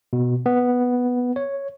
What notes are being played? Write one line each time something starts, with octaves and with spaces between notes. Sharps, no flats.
B2
B3
C#5